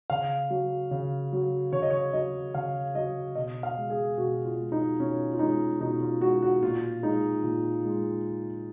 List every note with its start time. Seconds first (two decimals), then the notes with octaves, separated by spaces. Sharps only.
0.10 C#3 F5
0.50 F#3
0.91 C#3
1.33 F#3
1.72 C#3 C#5
1.82 D#5
1.90 C#5
2.13 F#3 D#5
2.55 C#3 F5
2.95 F#3 D#5
3.35 B2 D#5
3.63 F5
3.77 G#3
3.90 G#4
4.18 B2 F#4
4.45 F4
4.58 G#3
4.72 D#4
4.99 B2 C#4
5.33 F4
5.39 G#3 D#4
5.80 B2 D#4
6.01 F4
6.21 G#3 F#4
6.42 F#4
6.62 A#2 F4
7.02 G#3 D#4
7.44 A#2
7.84 G#3